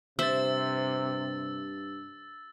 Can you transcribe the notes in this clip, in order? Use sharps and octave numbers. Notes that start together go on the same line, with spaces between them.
G2 C3 C5 E5 E6 A6